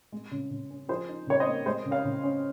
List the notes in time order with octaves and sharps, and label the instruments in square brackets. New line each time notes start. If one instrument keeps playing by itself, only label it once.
[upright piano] G#3
C#3
C#3
C#4
F3 G#4 C5
D#4
C#3 C#5
C5 D#5
A#3
G#3 C5 D#5
C#3
C#5 F5
C#3
C#4